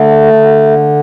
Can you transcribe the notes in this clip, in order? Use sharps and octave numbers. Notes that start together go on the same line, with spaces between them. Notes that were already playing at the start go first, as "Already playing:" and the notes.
Already playing: D3 A3
D3